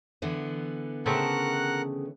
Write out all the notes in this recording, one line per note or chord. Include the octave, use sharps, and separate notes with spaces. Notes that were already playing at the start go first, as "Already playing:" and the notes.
D3 E3 B3
C#3 A3 C4 A#4 F#5 F#6